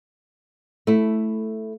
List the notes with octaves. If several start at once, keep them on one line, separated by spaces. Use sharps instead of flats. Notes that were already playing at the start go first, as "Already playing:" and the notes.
A3 E4